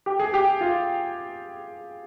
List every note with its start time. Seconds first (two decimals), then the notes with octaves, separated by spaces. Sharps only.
0.06 G4
0.19 G#4
0.34 G4
0.61 F4